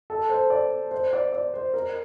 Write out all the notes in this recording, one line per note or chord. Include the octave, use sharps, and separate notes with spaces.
A4
C5
D5
C5
D5
D5
C5
A#4